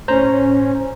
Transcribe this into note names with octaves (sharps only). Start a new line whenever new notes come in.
A2 C#4 C5 A#5